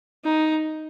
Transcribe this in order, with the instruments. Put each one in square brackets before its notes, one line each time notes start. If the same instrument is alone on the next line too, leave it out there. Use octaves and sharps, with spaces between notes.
[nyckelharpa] D#4